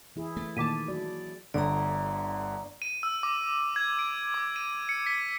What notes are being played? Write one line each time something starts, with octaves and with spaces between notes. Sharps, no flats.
E3 E4 G#4
A3
A#2 D#3 A5 D6 B6 D#7
F#3 F#4 D5
G1 D3 D5 A#5
D#7
E6
D6
G#6
D7
D6
D#7
C#7
B6